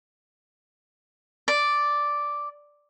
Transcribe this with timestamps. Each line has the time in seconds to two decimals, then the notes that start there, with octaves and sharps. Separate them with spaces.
1.48 D5